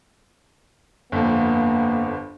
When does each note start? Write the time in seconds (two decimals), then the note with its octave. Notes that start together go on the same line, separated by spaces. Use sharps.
1.12 G1 F2 A#3 B3